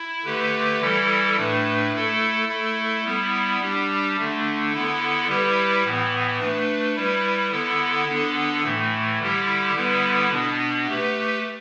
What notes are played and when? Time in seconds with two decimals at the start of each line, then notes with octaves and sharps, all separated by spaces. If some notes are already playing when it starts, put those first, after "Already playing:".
Already playing: E4
0.25 D3 A3 G4 B4
0.80 E3 G3 E4 A4
1.37 A2 A3 D4 B4
1.92 A3 E4 A4
2.48 A3 E4 A4
3.04 G3 B3 E4
3.60 G3 D4 G4
4.16 D3 A3 D4
4.71 D3 B3 E4 A4
5.27 G3 E4 G4 B4
5.83 A2 E3 B3
6.39 A3 D4 B4
6.96 G3 E4 B4
7.51 D3 B3 E4 A4
8.07 D3 B3 D4 A4
8.63 A2 E3 A3
9.19 D3 G3 E4 G4
9.74 D3 G3 B3 E4 B4
10.31 B2 B3 D4
10.87 A3 G4 B4